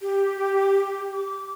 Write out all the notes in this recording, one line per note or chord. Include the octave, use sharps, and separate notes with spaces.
G4
D6